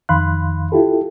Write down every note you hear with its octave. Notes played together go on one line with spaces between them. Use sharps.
F2 D#3 F5 B5 C6 F#6
E4 F4 G4 A4